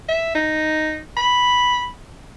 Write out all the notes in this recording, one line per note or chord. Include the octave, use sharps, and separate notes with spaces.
E5
D#4
B5